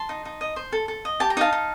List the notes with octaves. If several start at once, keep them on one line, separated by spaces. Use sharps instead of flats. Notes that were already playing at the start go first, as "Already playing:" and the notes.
Already playing: A5 C6
D#4
D#4
D#5
C5
A4
A4
D#5
G4 A5
A#5
D#4 F5 A5
D#4